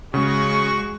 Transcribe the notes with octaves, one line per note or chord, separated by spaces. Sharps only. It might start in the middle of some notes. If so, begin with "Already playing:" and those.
C#3 G#3 F#4 C#6